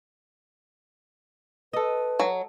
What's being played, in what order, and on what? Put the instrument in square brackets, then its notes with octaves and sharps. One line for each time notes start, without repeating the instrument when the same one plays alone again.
[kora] A4 D#5 [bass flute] B4
[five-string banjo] F#3